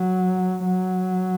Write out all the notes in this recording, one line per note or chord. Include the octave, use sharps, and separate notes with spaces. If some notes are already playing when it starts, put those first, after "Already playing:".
Already playing: F#3
F#3